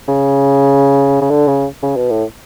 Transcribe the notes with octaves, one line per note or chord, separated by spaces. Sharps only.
C#3
C#3
D3
C#3
C#3
B2
A2